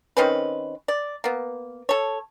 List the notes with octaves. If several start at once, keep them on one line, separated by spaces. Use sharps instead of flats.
D#3 C4 C#4 B4
D5
A#3 B3
A4 C#5